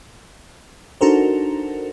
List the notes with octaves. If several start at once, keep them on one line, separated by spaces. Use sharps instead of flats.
D4 D#4 F#4 A4 A#4 C5